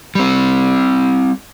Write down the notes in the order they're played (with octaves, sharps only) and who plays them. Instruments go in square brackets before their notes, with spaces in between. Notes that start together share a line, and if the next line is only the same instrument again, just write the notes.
[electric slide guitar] G3 C4